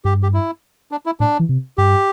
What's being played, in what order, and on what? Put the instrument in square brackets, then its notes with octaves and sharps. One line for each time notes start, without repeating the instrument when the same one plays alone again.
[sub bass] G2 [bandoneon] G4
[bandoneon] G4
E4
D4
E4
[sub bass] A2 [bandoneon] D4
[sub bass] E3
C3
[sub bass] G2 [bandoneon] G4